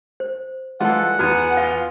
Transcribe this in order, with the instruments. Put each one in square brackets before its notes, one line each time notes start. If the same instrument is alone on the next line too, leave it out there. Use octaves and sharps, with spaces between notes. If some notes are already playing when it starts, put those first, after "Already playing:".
[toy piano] C5
[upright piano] E3 G3 G#3 [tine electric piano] F4 A4 [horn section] F#5
[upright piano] E2 F6 [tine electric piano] B3 G#5 C#7 [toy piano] E4 F#4
[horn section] F4 [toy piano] F5